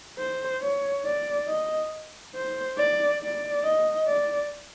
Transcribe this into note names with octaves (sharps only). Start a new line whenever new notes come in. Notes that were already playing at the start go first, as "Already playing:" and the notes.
C5
C#5
D5
D#5
C5
D5
D5
D#5
D5